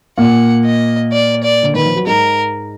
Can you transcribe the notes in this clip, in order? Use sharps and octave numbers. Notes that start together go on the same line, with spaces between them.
A#2 A#3 F#5
D#5
D5
D5
D3
D#3 B4
F3
F#3
G#2 G#3 A#4